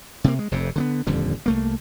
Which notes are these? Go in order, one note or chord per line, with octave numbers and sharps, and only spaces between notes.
C3 A3 A#3
G#3
F1 F2 C3
D3 A#3 B3
D#1 F2 D3 G3
C2 A3 A#3